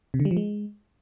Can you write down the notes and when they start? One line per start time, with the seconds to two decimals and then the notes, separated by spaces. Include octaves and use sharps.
0.14 C3
0.20 D3
0.25 G3
0.31 F3
0.37 G#3